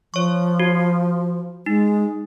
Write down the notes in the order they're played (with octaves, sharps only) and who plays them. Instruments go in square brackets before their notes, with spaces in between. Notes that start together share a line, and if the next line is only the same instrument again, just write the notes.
[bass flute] F3 [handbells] C#5 C#6
[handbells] F#4
[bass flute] G#3 [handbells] D#4